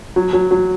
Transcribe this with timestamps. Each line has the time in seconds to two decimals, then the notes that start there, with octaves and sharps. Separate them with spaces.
0.16 F#3
0.33 F#3
0.51 F#3